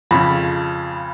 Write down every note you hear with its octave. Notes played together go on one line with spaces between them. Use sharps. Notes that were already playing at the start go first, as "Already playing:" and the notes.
F2 C#3 B5